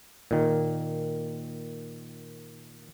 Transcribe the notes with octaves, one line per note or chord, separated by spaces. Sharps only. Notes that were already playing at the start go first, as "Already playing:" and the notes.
A#2 D#3